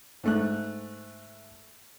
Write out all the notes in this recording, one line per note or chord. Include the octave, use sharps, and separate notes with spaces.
G#2 A3 F#6